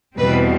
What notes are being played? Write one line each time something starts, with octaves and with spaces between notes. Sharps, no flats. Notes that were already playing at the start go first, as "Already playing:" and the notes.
E2 B2 G3 C4 B4